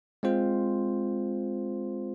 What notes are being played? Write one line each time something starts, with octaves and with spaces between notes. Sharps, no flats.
G#3 C4 F4 C5